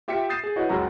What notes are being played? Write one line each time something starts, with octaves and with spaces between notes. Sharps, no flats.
F4 G4 E5 G5 B6 C#7
D#6 G6 A6 C7 D#7 E7
G#4
E4 F#4 B4 C#5 D#5
C#2 F#2 C#3 F#3 F#4 A#5